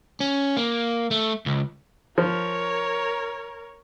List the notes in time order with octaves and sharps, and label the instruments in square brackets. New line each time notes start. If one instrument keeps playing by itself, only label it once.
[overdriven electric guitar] C#4
A#3
A3
C#2
[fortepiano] F3 [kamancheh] A#4 C#5